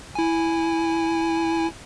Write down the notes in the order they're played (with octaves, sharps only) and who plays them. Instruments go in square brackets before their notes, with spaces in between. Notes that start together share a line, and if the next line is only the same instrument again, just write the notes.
[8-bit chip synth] E4 G#5